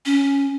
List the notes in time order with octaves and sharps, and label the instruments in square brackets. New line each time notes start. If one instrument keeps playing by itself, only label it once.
[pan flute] C#4